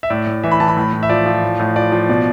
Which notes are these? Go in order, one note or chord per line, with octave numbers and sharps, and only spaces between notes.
E5
A2 D5
A2
E3 E5
B5
E3 A5
B5
A2
A2
E5
F3 D5
F3
A2
A2
F3 D5
F3
B2 D5